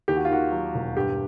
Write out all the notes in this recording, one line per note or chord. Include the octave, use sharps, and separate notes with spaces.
D#2 G4
F#4
F4
D#3 F#4
F#3
E1
G2 G4